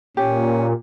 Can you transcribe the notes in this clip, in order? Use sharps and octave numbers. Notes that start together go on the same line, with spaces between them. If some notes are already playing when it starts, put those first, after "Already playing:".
A#2 C#4 G4